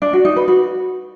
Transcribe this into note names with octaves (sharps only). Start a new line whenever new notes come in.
D4
F#4
D#4
B4
F#4